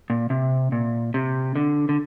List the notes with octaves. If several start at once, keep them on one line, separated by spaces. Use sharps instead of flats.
A#2
C3
A#2
C3
D3
D3